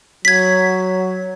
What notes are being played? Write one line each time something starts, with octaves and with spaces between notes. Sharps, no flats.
F#3 G#6 B6